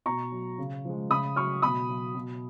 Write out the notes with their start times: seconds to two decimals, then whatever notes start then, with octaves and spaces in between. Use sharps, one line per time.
0.06 B2 A#5 C#6
0.32 F#3
0.58 C#3
0.85 F3 G#3
1.10 C#3 B5 D#6
1.36 F#3 C#6 F6
1.62 B2 B5 D#6
1.89 F#3
2.15 B2